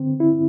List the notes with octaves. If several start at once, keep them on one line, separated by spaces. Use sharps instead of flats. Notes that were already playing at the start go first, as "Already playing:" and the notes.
Already playing: D3 C4
E4